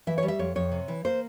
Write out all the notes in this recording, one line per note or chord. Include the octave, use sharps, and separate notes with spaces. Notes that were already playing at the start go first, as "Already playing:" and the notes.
E3 E5
C#5
G3
E5
F2 C#5
F2 C#5
C3
E3
A#3 C5